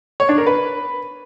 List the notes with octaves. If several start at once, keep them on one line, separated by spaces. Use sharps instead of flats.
C#5
D4
A#4
B4